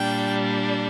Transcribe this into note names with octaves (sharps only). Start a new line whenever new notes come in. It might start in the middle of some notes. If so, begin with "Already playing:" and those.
Already playing: A#2 G3 D4 G5